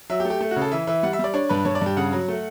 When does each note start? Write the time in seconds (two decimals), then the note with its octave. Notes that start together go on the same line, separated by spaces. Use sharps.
0.10 F#3 E5
0.20 G4
0.25 A3
0.30 G4
0.41 A3
0.51 F#4
0.56 C#3
0.61 A4
0.72 E3 E5
0.87 E3 E5
1.03 G3 F#5
1.13 E5
1.19 G3 D5
1.34 D4 C#5
1.49 G2 B4
1.65 G2 C#5
1.75 D5
1.81 G2 G4
1.97 C#3 F#5
2.12 F#3
2.28 A3